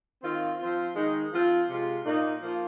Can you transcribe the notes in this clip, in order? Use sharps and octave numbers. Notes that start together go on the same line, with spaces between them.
D#3 C4 F4
F3 C4 F4
D#3 G#3 D#4
F3 C4 F4
C3 G#3 F4
A#2 A#3 D#4
F3 A#3 F4